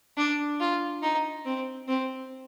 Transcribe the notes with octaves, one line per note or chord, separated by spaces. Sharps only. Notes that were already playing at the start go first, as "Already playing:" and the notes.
D4
F4
D#4
C4
C4